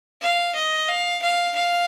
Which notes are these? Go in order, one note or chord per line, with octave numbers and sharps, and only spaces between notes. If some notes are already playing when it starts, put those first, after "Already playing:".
F5
D#5
F5
F5
F5